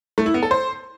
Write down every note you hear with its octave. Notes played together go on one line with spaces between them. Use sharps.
A3
E4
B3
A4
C5